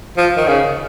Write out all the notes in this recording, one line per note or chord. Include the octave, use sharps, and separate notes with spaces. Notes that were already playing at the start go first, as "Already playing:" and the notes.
F3
D#3
C#3